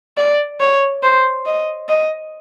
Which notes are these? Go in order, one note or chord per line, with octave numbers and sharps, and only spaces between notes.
D5
C#5
C5
D#5
D#5